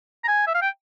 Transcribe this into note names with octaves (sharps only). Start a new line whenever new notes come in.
A#5
G#5
E5
F5
G5